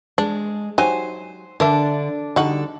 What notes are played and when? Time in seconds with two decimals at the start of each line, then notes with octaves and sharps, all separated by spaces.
0.18 G#3 D4
0.78 F#3 D#4 G4 C5 G#5
1.60 D3 D4 A#4 E5
2.36 D3 G3 D#4 F#4 A4